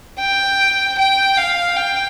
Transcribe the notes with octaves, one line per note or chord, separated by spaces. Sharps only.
G5
G5
F5
G5